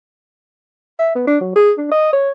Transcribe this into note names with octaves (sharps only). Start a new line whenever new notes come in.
E5
B3
D4
F#3
G#4
D4
D#5
C#5